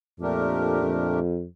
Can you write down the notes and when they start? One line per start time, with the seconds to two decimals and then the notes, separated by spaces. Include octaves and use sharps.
0.20 F2 A#2 A3 D4 G4 A#4
0.83 F2